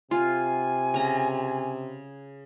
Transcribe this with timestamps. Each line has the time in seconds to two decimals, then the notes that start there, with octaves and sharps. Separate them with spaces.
0.11 C3 F4 G#5
0.94 C#3 A#5